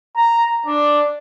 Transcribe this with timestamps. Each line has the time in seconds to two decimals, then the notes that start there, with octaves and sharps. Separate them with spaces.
0.17 A#5
0.67 D4